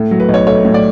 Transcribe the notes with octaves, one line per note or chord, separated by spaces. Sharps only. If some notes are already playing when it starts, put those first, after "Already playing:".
Already playing: A2 A3
F#3
B4
B1
C#5
A3 C#5
A2
D5